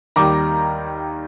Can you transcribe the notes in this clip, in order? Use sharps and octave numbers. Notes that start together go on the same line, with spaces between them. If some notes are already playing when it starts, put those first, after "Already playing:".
D#2 D#3 G3 A#5 D6